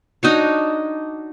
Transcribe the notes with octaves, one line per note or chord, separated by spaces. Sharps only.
D4 D#4 F#4 C#5